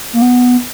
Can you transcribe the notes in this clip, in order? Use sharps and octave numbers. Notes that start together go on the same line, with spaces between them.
A#3
B3